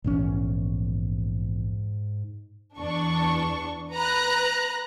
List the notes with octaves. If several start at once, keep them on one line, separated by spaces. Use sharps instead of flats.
A#1 E2 G#2 C#4
E2 D4 C#6
B4 A#5 F#6